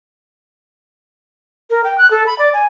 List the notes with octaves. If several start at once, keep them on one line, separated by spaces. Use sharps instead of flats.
A#4
G5
F#6
A4
B5
D5
G#5